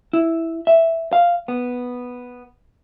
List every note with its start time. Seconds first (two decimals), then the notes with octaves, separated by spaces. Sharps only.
0.13 E4
0.67 E5
1.13 F5
1.48 B3